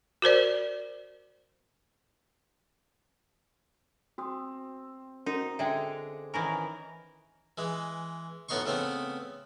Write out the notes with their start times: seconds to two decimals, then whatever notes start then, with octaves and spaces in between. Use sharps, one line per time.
0.22 F#4 A#4 C5 D5
4.18 C4 F#4 D#6
5.26 C#4 D#4 F#4 A#4
5.59 D3 G#3 E5 G5
6.34 D#3 E3 C#4 A#4 A#5
7.58 E3 G#3
8.49 D2 A2 B3 D#4 C6 C#6
8.66 C#3 A3 B3 C4